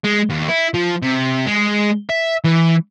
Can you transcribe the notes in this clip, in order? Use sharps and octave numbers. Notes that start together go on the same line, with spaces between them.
G#3
D#2
E4
F3
C3
G#3
E5
E3